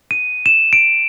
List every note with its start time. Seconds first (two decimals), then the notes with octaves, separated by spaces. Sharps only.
0.11 D#7
0.46 E7
0.73 D7